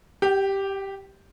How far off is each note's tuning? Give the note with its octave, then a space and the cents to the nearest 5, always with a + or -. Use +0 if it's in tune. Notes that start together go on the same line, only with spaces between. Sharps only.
G4 +0 G5 -40